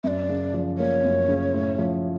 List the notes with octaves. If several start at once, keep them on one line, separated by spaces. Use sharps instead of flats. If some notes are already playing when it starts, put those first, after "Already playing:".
F#2 D5 E5
C#3
F3
A#3 C#5
F#2
C#3
A2
F3